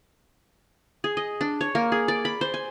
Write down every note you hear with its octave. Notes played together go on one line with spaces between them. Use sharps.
G#4
D#5
D4
C#5
A#3
G#4
D5
B5
C5
G#5